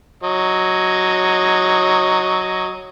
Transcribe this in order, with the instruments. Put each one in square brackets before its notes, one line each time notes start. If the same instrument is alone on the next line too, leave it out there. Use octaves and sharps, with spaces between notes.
[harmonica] F#3 D#5